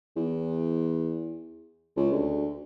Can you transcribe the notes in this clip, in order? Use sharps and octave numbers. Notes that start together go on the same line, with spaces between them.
E2
C#2
D2